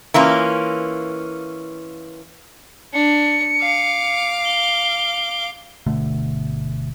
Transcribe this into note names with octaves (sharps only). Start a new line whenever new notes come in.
E3 A#3 C#4 F4
D4 C#7
F5 D6
G7
G1 B2 D3 A3